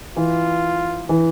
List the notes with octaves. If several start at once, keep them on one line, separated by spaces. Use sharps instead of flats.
E3 F4
E3